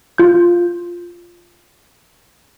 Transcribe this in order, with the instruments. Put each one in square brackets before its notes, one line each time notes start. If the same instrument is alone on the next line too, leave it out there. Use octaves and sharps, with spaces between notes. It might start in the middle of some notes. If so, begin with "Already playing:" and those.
[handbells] F4 G6